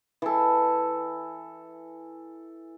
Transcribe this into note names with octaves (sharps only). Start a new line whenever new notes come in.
E3 A4